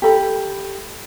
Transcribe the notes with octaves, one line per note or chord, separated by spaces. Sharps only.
G4 A4 B5